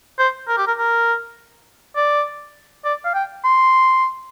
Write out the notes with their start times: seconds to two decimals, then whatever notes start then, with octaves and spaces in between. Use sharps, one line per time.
0.19 C5
0.48 A#4
0.57 G4
0.67 A#4
0.78 A#4
1.96 D5
2.84 D5
3.05 F5
3.14 G5
3.44 C6